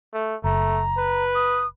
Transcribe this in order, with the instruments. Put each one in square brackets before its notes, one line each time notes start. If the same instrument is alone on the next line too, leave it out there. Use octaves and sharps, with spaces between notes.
[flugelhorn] A3
[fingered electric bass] F#1 [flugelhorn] A3 [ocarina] A#5
[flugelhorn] B4
[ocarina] D#6